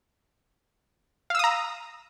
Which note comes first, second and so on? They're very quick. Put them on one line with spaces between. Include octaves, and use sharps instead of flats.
F5 E6 D#6 A#5